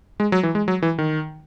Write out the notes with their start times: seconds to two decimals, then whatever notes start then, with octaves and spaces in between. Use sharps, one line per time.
0.20 G#3
0.32 F#3
0.43 E3
0.55 G#3
0.68 F#3
0.82 E3
0.98 D#3